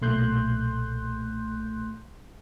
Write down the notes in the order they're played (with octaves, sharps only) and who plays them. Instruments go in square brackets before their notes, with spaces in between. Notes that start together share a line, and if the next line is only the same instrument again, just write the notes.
[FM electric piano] B1 A#2 A3 C6 F#6 G6